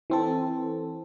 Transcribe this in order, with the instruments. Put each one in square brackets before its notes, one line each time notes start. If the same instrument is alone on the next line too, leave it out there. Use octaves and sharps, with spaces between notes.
[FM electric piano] E3 C4 A4